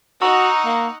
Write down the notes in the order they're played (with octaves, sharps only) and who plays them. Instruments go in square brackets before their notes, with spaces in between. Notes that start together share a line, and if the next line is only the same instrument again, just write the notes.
[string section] D#4 F#5 [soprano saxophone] F#4 [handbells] A#5 C#6 E6
[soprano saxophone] A#3